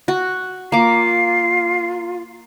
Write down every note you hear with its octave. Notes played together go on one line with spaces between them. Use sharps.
F#4
A#3 F4 D6 C7